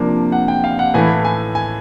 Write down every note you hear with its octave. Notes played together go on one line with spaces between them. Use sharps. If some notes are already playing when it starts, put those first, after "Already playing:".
Already playing: C3 F3 A#3 D4
F#5
G5
F5
F#5
A2 E3 A3 G#5
G#5
G#5